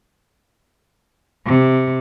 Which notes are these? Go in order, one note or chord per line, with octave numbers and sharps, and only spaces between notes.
C3